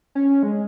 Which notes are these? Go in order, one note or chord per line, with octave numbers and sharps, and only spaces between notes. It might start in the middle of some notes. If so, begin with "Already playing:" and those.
C#4
G#3